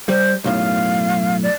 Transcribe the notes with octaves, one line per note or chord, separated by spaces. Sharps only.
G3 C5
B1 F#2 A2 F5
D5